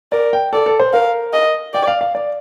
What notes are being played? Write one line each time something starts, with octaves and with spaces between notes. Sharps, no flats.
A#4 D5
G5
A4 D5
A4
C5
A#4 F5
D#5
D5 G5
F5
F5
D5